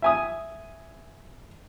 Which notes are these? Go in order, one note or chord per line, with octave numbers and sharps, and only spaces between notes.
E5 G#5 D#6